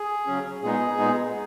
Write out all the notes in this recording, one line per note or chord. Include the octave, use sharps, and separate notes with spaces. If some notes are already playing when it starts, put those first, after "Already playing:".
Already playing: G#4
C#3 F#3 C#4
A#2 G#3 B3 D#4 G#4
A#2 G#3 B3 D#4